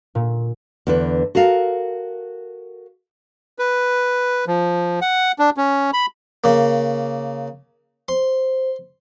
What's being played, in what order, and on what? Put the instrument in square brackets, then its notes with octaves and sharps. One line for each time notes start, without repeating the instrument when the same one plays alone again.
[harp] A#2
[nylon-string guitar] E2 D3 B4
F#4 A4 A#4 F5
[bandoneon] B4
F3
F#5
D4
C#4
B5
[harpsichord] C#3 A#3
[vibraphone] C5 [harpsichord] C6